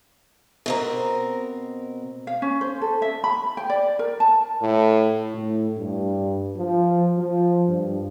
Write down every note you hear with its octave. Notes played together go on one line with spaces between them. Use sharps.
B2 C4 A#4
F5
C#4
C5
A4
E5
B5
G5
D5
A#4
A5
A2
A2
G2
F3
F3
G2